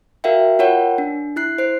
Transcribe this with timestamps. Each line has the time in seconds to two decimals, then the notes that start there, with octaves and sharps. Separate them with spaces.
0.24 F#4 A#4 E5 F5 G5
0.59 F4 A#4 C#5 F#5 G5
0.98 D4
1.36 E4 F#6 C7
1.58 C5 C7